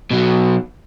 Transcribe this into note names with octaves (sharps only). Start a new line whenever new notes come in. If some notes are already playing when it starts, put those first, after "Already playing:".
B2 F#3